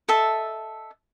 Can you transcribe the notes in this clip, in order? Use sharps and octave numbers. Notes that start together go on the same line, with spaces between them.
A4 D#5 E5 A5